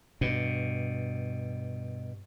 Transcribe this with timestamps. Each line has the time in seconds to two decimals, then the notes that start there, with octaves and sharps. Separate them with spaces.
0.21 G2 B2